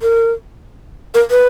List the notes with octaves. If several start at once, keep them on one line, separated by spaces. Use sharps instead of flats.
A#4
A#4
B4